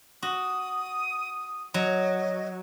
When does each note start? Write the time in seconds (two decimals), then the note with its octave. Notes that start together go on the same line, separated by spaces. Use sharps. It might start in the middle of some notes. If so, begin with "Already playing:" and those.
0.23 F#4 D#6
1.74 F#3 D#5